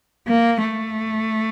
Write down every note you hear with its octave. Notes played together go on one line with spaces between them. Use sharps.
A#3
A3